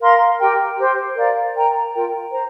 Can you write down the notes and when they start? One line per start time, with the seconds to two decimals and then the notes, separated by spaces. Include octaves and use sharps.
0.02 A#4 F5 C6
0.39 G4 A#4 G5
0.78 G4 C5 G5
1.16 A#4 D5 F5
1.54 A#4 G5 A#5
1.93 F4 A#4 G5
2.30 C5 A#5